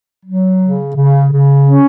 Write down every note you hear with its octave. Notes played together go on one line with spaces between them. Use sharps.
F#3
C#3
C#3
C#3
C#4